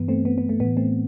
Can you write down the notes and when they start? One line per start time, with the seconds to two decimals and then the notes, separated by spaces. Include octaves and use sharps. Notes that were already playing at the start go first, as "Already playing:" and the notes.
Already playing: G2 E3 B3
0.08 A3 C4
0.25 B3
0.38 B3
0.49 A3
0.60 A2 E3 B3
0.77 A3 C4